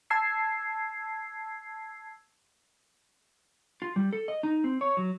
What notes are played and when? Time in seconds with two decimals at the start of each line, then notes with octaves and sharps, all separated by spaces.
0.10 A5 E6 G#6 C7
3.82 F4
3.96 G3
4.13 A4
4.28 D#5
4.43 D#4
4.64 C4
4.81 C#5
4.97 F#3